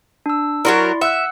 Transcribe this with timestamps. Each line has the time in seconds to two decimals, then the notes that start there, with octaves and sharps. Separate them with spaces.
0.26 D4 E6
0.65 F#3 E4 F#4 A#4 D5 C6
1.01 E5 F#5 E6 F#6